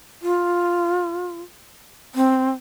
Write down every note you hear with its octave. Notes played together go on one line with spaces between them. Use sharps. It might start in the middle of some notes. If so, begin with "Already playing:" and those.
F4
C4